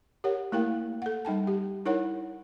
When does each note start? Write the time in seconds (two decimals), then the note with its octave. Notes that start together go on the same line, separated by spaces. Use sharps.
0.24 G4 A#4 C#5 F#5
0.52 A3 A#3 E4 A#4 F5 G5
1.02 A4 F#5
1.25 G3 D#4 G5 A5
1.47 G4
1.86 D#4 E4 A#4 C#5 F#5